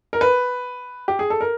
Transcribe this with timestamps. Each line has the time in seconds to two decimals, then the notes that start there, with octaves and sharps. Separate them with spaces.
0.13 A#4
0.21 B4
1.08 G4
1.19 G#4
1.30 A4
1.41 A#4